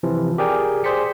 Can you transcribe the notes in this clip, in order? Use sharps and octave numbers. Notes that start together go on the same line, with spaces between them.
C3 E3 F3
G4 G#4 A#4 D5 G5 G#5
G#4 C5 D5 B6 C#7